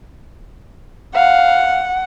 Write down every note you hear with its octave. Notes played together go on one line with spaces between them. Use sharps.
F5 F#5